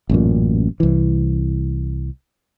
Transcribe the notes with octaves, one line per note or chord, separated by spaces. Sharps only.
A1 F#2 A#2
C2 E3